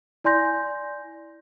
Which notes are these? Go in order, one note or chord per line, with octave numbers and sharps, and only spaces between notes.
E4 D5 G#5 C6 G6 A#6